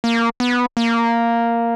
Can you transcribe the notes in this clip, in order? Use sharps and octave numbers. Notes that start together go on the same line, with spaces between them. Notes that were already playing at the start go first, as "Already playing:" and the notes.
A#3
B3
A#3